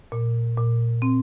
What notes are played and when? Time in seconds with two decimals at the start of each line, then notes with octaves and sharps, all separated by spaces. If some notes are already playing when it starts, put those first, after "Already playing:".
0.12 A#2
0.57 A#2
1.02 C4